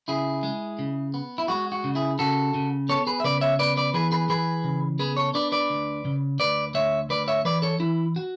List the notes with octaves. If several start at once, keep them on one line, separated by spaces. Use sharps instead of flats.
C#3 E4 G#4
G#3
C#3
B3
E4
G#3 F#4
F#4
C#3
E4 G#4
C#3 F#4 A4
C#3
B3 A4 C#5
G#4 B4
E5
C#3 B4 D5
C#5 E5
B3 B4 D5
B4 D5
E3 G#4 B4
G#4 B4
E3 G#4 B4
C#3
B3 G#4 B4
A4 C#5
D4 B4 D5
B4 D5
D2
C#3
D2 B4 D5
D2 C#5 E5
D2 B4 D5
C#5 E5
E3 B4 D5
A4 C#5
E3 E4
F#4